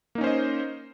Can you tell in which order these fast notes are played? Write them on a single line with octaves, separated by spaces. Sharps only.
A#3 D#4 C#4 C5 D#5